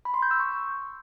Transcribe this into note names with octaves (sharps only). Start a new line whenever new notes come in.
B5
C6
G6
E6
C#6